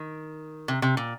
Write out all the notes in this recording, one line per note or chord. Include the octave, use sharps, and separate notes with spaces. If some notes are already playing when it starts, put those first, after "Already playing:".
Already playing: D#3
C3
C3
A#2